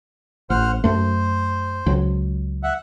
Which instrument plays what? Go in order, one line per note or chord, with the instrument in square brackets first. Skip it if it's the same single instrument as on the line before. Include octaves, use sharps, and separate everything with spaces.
[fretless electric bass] A1 [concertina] C5 F#5 F6
[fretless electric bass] F#2 A3 [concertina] C5
[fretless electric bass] C#2 F#3
[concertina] E5 F#5